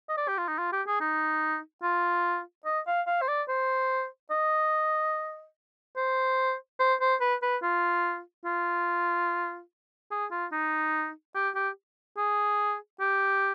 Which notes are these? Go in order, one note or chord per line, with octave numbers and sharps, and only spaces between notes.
D#5
D5
G4
F4
D#4
F4
G4
G#4
D#4
F4
D#5
F5
F5
C5
D5
C5
D#5
C5
C5
C5
B4
B4
F4
F4
G#4
F4
D#4
G4
G4
G#4
G4